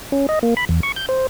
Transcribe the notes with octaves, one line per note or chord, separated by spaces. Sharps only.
C#4
D#5
A#3
B5
E2
C#6
G6
C5